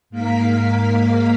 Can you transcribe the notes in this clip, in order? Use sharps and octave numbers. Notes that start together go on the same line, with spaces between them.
G#2 A#3 A#4 F5 B6